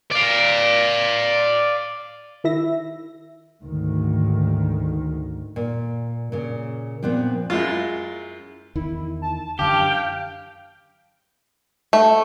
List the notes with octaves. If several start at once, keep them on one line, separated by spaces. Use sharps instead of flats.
D5 F5
D#3 E4 E5 A#6
D2 G#2 D#3
A#2
A#2 C#3
A#2 F3 B3 C4 D4
F#2 G#3 E4 F4
E2 D#3 E4
A5
F#2 D3 G4 F5 G5
A3